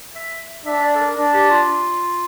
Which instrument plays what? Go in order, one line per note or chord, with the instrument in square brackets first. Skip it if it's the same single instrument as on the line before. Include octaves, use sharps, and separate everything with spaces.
[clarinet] E5
[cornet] D4 [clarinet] E5
[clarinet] D5
A4
A#4
[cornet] D4
[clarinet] G4
F4